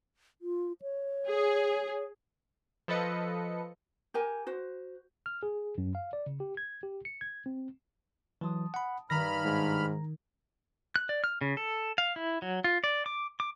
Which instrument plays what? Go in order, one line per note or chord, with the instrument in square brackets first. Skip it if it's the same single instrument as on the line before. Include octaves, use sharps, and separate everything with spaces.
[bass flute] F4
C#5
[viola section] G#4
[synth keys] F3 A4 B4 D#5 C#7
[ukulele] G4 A#4 G#5
F#4 C5
[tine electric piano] F6
G#4
F#2
F5
D5
C#3
G4
G#6
G4
C#7
G#6
C4
[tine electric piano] E3 F#3 [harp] A5 C6 D#6
[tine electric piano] F#5 B5
[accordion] G2 B5 F6 [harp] D#3 E6 [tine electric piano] A#5 A#6
[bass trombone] G#2 [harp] G#6
[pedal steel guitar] F#6
D5
F6
C#3
A4
F5
E4
F#3
F4
D5
D6
D6